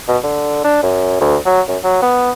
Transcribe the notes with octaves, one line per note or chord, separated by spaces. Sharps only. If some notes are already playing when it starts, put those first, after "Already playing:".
B2
D3
D4
F#2
D2
F#3
F#2
F#3
B3